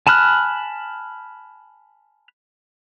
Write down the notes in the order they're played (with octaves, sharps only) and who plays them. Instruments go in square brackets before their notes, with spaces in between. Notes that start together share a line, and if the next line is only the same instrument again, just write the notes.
[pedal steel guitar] G#5 A5 B5 F6 F#6